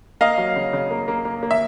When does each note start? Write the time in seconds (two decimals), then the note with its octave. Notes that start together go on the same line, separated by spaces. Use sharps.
0.21 A#3 D#5 F5
0.38 F#3
0.56 C#3
0.73 C#3
0.91 A#3
1.08 A#3
1.25 A#3
1.43 A#3
1.51 E5